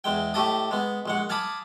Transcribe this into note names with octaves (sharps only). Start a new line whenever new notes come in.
E2 G#3 G5
A2 A3 G4 D#5 A5 D#6
G#3 B3
A#1 G#3 F#5
F5 G#5 A5 B5 D6 D#6